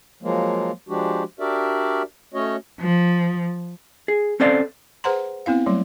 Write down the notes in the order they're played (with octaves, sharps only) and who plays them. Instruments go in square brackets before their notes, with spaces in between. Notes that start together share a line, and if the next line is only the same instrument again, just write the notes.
[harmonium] F3 F#3 G#3 A#3
F3 G#3 D4 F#4 G4
D4 F#4 G4 A#4 D5 E5
A3 C#4 F#4 C#5 D#5
[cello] F3
[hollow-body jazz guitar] G#4
C4 C#4 A4 C5 D5 F5
[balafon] G#4 B4 C5 F#5 A#5 C6
B3 C4 E4 F5
F#3 G3 A3